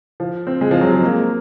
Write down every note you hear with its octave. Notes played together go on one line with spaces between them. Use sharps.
F3
C4
G#3
F3
F#3
G#3
A#3